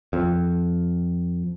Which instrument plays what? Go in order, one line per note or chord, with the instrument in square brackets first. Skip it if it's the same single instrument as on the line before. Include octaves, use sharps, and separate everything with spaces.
[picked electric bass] F2